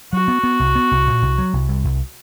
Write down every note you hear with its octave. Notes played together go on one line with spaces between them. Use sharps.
F#3 F#4
B3
B3
C2
B3
C2
A#2
C2
F#3
C2
C2
C2